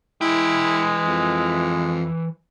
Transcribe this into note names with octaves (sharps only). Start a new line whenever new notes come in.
E3 G#3 E4 G5
F2